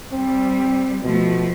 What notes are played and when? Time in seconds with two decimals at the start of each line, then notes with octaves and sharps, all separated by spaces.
0.12 G3 C4
1.03 B2 F3 A3